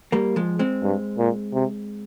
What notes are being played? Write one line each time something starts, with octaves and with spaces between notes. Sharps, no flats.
G3 A#3
F3 G#3
G#3 C4
G2
A#2
C3